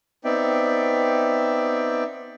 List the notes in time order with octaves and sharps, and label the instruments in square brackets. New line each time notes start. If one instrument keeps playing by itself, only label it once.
[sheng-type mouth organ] B3 C4 D#4 D5 E5 G5